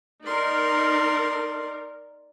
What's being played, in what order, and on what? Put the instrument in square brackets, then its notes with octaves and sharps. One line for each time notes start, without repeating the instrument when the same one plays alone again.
[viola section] D#4 A#4 [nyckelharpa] D5 C6